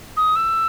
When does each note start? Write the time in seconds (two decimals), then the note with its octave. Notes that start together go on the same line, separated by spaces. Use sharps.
0.17 D#6
0.36 E6